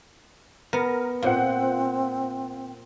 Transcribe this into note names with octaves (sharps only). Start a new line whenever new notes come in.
B3 A#4
A#2 C4 F4 C5 F#5